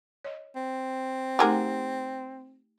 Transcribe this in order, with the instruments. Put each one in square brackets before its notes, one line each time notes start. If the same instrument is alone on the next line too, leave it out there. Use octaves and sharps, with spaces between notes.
[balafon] C#5 D#5
[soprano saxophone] C4
[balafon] A3 D#4 F#5 [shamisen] G4 G#4 A#4